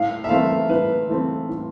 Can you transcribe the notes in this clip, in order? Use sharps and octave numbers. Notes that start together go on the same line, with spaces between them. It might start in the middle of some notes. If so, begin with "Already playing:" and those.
Already playing: A2 F5
E5
E3 A3 C4 F5
A2 B4
E3 A3 C4
A2